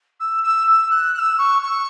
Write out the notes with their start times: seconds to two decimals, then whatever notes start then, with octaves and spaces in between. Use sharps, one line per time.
0.20 E6
0.43 E6
0.67 E6
0.91 F#6
1.14 F#6
1.19 E6
1.38 C#6
1.62 C#6